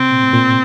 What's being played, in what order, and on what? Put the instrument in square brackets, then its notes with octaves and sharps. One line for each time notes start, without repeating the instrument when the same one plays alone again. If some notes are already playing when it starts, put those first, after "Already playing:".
Already playing: [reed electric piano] C3 [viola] C4
[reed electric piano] A#2
A2
A#2